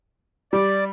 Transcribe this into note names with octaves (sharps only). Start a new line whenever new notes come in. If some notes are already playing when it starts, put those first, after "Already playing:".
G3 D5